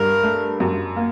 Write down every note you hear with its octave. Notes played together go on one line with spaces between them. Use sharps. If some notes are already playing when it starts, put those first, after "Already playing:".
Already playing: G2 A#4
A3
F#2
A#3